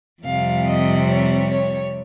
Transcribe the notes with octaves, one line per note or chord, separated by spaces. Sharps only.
F2 C3 G3 F5
D#5
C#5
C#5